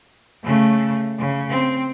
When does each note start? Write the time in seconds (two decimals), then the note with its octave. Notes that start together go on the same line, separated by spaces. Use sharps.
0.44 C#3 A3
1.19 C#3
1.49 C4